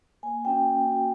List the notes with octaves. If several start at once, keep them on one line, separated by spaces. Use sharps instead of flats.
A#3 G#5
C#4 F#4 G5
A#3
C#4 F#4